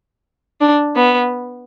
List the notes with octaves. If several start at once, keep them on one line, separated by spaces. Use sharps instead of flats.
D4
B3